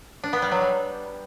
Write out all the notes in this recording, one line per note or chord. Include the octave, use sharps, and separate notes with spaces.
D4
B3
G3
F#3
G3